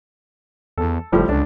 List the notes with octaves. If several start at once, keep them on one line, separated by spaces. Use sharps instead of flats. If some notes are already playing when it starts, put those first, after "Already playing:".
E2 A4
F#1 A2 F3 G3
C#2 D4